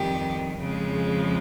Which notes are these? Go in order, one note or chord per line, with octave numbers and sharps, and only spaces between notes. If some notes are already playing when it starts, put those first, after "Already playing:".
Already playing: F2 D#3 G3 G4
F2 C#3 F3 G#3